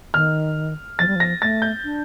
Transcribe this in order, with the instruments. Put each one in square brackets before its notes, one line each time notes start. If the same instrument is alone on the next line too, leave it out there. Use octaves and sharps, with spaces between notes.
[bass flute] D#3 [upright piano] F6
[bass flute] F3 [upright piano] A6
[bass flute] G3
[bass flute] F3 [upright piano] A#6
[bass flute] A3 [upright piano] A6
[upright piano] G6
[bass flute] D4